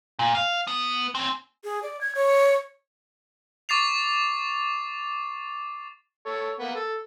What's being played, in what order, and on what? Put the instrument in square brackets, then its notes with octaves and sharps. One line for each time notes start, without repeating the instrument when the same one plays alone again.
[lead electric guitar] A#2
F5
B3
C4 C#4
[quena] G#4
D5
G#6
C#5
[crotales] C#6 D6 A6 C7 F7
[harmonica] A4 C#5
A#3 B3
A4